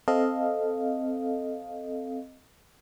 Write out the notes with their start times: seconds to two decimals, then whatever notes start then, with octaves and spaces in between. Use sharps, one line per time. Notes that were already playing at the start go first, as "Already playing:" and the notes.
0.08 C4 A4 D#5 F5